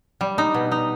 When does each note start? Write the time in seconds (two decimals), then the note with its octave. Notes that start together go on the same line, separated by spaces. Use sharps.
0.21 G3
0.38 D#4
0.54 B2
0.72 D#4